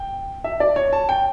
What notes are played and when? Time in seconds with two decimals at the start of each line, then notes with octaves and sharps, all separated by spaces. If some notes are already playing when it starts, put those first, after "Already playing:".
Already playing: G5
0.44 E5
0.60 D5
0.76 C#5
0.93 A5
1.09 G5